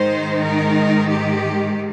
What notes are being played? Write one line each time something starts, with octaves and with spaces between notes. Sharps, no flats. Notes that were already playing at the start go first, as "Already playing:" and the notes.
Already playing: G#2 D#3 G#3 D#4 C5
A#4
G4